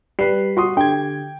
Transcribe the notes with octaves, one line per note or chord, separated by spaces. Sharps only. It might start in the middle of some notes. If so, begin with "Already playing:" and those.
G3 B4 C7
F#4 C6 D#6
D3 G4 G5 G#6